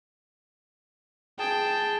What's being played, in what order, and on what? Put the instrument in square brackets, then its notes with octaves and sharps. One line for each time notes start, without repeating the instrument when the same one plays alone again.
[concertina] G#4 A5 [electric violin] G5